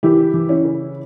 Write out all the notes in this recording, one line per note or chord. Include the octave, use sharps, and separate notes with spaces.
E3 E4 G4
E3
C#4 E4
C#3